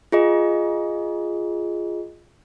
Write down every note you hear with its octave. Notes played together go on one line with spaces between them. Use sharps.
F4 G#4 D#5